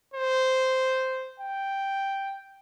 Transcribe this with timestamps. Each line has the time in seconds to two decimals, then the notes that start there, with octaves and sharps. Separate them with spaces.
0.14 C5
1.40 G5